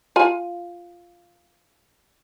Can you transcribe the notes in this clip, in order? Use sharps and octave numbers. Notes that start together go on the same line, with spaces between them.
F4 G#5